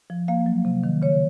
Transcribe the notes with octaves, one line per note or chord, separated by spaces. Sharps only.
F3
A#3 F5
F#3
C3
D#3
C#3 C#5